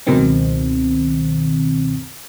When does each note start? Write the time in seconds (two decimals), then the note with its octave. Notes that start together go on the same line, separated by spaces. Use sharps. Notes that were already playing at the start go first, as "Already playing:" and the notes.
0.07 C#2 F#2 B2 D#3 C4